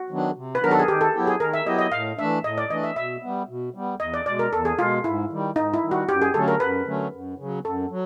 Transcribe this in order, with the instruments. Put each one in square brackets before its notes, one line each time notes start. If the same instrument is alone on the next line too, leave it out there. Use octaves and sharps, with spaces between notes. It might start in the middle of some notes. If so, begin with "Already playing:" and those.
Already playing: [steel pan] F#4
[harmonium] D#3 F#3 B3 D4
C3
[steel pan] B4
[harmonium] D#3 F#3 B3 D4 [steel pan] A#4
[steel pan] A4
G#4
[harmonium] D#3 [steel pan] G4
[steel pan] A4
[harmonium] F#3 B3 E4 G4
[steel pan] G#4
[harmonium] D#3 [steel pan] A#4
[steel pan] E5
[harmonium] F#3 B3 E4 G4 [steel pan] D#5
[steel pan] D#5
[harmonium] A2 [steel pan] F5
[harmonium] E3 A3 D4 [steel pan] E5
[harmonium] A2 [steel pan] D#5
[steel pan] D5
[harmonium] E3 A3 D4 [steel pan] D#5
[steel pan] E5
[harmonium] B2 [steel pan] E5
[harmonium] G3 B3
B2
G3 B3
[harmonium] E2 [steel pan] D#5
[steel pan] D5
[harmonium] B2 G#3 [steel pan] D5
[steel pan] A#4
[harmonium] E2 [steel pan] A4
[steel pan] G#4
[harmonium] B2 G#3 [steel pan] F4
[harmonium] G#2 [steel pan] E4
[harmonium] D#3 G3
[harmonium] G#2 [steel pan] D#4
[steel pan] E4
[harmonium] D#3 G3
[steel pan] F#4
[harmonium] F#2 [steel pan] G4
[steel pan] G#4
[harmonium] D3 F#3 A3 C#4 [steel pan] A4
[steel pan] A#4
[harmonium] F#2 [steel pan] B4
[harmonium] D3 F#3 A3 C#4
F#2
C#3 F#3
[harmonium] F#2 [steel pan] A4
[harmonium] F#3